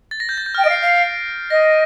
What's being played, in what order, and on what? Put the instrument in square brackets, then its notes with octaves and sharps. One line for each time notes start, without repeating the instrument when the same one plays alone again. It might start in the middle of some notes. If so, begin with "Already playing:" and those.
[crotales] A6
A#6
G6
A6
G6
F6
[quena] G5
[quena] D#5 [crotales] D7
[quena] F5
[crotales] C7
[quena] F5
[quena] D#5 [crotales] A#6